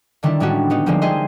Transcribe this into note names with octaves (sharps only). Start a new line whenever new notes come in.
D3 D#3 G3 D4 E4
A2 G3 G#3 C#4 D4 F#4
G3 B3 D#4
D3 F3 G3 G#3 A#3 C4
E4 G#4 C5 D#5 C6